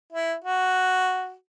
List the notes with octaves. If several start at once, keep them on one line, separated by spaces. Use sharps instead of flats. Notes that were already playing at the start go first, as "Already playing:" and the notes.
E4
F#4